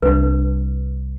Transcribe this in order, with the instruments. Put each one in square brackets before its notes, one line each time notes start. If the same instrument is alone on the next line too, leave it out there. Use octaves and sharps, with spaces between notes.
[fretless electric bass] C2 D4 [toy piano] B4